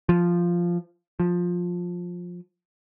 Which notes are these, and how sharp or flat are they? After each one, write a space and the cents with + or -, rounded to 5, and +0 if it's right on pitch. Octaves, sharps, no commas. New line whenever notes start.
F3 -5
F3 +15